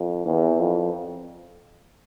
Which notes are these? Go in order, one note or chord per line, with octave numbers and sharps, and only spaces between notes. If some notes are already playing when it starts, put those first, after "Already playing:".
Already playing: F2
E2
F2